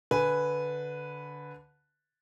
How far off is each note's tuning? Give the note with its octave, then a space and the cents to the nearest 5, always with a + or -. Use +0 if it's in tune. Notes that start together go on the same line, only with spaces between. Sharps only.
D3 -10 B4 +0 G#5 +0